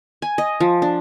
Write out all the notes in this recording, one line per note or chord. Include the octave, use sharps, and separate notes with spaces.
G#5
D#5
F3
D4